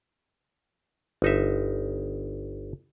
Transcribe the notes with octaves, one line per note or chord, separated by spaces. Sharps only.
G1 D#4 E5